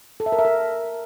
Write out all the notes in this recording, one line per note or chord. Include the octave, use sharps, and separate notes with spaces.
A4
E5
A#4
E5
A#4